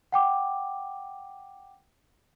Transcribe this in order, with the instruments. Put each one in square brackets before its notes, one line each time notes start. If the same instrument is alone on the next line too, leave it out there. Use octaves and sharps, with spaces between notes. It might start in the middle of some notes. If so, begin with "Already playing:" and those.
[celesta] F#5 G5 D6